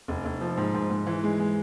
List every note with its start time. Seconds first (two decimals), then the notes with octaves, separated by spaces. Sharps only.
0.08 F1
0.25 F1
0.41 F3
0.57 G#2
0.74 G#2
0.90 G#2
1.07 E3
1.23 G#3
1.40 G#3